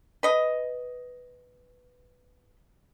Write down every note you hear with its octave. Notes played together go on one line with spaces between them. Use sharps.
B4 D#5